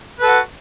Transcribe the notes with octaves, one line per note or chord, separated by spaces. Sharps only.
F#4 A4 B4